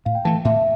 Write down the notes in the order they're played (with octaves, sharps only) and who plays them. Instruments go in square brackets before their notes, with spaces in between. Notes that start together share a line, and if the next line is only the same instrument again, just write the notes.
[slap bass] A2 [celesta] F5
[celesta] G5
[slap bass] E3 A3 [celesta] A5
[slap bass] A2 [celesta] E5